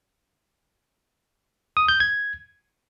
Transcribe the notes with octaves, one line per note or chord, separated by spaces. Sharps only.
D#6
G6
G#6